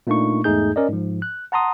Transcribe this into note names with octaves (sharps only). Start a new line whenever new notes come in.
A#2 A3 A#3 D4 D#4 C#6
E2 G#2 A3 D#4 G#4 G6
C#4 A#4 D5 D#5
G#2 F3
F#6
F#5 A5 A#5 C6 D#6